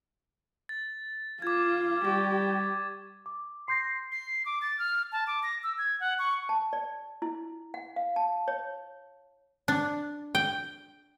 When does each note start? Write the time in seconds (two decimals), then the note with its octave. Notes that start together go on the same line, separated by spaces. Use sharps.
0.69 A6
1.42 F4 D6 G#6
2.05 G3 G4 C#6 A6
3.26 D6
3.68 C6 G6 A#6 C7
4.12 C7
4.46 D6
4.62 A6
4.79 F6
5.12 A5
5.27 D6
5.43 A#6
5.64 E6
5.78 G#6
6.00 F#5
6.19 C#6
6.49 A5
6.73 D5
7.22 E4
7.74 F#5
7.96 F5
8.16 A5
8.48 C#5
9.68 D4
10.35 G5